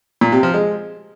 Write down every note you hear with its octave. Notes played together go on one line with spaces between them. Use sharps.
A#2
C3
F3
G#3